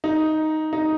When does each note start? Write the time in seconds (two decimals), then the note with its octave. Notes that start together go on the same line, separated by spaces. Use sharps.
0.04 D#4
0.73 D#4